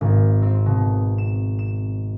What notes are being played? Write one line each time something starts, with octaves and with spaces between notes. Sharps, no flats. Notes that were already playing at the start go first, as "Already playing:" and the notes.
G#1
C4
B2
E7
E7